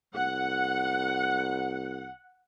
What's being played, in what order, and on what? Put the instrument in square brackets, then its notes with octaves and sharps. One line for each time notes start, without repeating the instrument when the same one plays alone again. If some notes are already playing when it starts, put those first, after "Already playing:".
[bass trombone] C2 [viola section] F#5